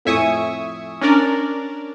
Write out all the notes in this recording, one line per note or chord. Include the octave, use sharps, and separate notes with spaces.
F2 A2 E5 G#5 C#6 D#6
C#4 D4 A#4 D5